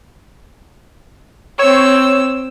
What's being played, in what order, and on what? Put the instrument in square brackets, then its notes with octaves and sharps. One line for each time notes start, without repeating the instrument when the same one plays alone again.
[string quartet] C4 E6 [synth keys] C#5